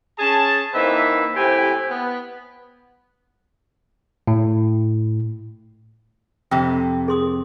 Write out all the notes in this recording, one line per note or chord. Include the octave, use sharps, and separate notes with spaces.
C#4 G#4 A5
E3 A#3 C4 D#4 B4 E5
A2 C3 C4 G4 G#5 B5
B3
A2
F2 C3 G5
G#4 C6 D#6